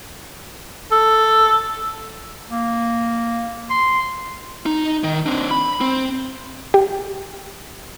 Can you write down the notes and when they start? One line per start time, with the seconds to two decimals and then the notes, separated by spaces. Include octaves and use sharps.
0.92 A4
2.51 A#3
3.70 C6
4.66 D#4
5.04 D#3
5.26 C4 D4
5.51 B5
5.81 C4
6.74 G4